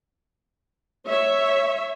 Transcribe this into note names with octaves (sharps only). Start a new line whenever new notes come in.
C#5 E5